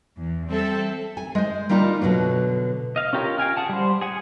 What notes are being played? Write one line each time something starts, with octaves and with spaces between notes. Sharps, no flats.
E2
G3 C4 A4 E5
G#5
G#3 C5
G3 A#3 D4 D#4 F4
B2 D3 F3 F#3
D#5 F5
C#4 F4 G4 A#4 C#5
F5 G5 G#5 F6
G#4 F#5 A5
G3 C5
G#4 F#5 G#5